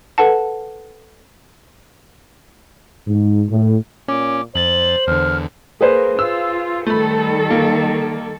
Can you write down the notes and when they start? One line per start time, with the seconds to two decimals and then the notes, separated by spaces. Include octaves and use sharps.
0.18 A4 B4 F#5 A5
3.07 G#2
3.51 A2
4.08 A#2 C#4 D6
4.55 F2 C5 A6 F#7
5.07 E2 D3 F6
5.81 A#3 G#4 B4 C5
6.19 F4 E6
6.87 D#3 G3 A3 A4 B5
7.50 A#3